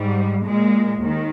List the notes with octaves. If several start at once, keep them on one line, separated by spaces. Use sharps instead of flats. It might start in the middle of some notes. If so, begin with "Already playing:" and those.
Already playing: G#2 G3
A#2 G#3
D#2 D#3